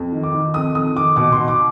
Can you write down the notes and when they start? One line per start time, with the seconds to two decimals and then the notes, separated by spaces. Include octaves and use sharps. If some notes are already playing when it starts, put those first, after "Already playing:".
Already playing: F2
0.12 D#3
0.23 D6
0.34 D#3
0.54 F2 D#6
0.75 F2 D#6
0.96 D#3 D6
1.16 B2 D6
1.32 C6
1.38 B2
1.48 D6